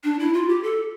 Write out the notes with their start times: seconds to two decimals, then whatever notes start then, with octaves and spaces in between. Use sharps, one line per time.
0.04 D4
0.19 E4
0.33 F4
0.49 G4
0.63 A4